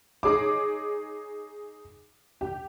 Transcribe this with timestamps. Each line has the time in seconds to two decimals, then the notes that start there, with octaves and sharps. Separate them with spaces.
0.23 D#4 G#4 C#5 D6
2.41 G4